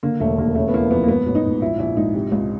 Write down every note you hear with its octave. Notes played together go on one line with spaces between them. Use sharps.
D3 A#3
E1 A3
D#2 A#3
C#3 A3
B3
E3 A#3
F2 B3
A#3
G#2 B3
A1
D#4
G#2
A#1 E4
A#1 E4
G#2 D#4
C3
C#2